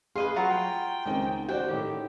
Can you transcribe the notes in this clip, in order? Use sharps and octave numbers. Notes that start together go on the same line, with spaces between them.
G#4 B4 D#5 F5 C6
F#3 F4 F#4 A#5
G5
C#2 D#3 C4
F#4 C5 D5 G5
A2 D#3 G4